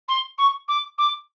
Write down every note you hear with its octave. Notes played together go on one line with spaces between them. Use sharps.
C6
C#6
D6
D6